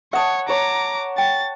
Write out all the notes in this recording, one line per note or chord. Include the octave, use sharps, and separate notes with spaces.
C#5 E5 F#5 A5 D#6
C#5 A5 A#5 D6
G5 A6